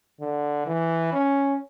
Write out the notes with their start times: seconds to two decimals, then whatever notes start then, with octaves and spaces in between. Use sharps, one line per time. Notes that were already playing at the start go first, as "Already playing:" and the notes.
0.21 D3
0.67 E3
1.13 C#4